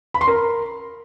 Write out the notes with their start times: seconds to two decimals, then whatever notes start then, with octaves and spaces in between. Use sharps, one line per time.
0.14 B5
0.21 C6
0.28 A#4